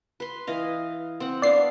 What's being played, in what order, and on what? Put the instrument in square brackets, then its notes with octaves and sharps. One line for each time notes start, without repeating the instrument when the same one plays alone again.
[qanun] B4 C6
E3 D#5 F5
C4 F#5
[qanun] B3 D4 F5 [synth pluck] D5 C7